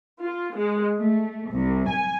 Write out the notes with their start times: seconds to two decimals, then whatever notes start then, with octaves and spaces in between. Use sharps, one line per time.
0.22 F4
0.55 G#3
0.99 A3
1.51 C2
1.89 G#5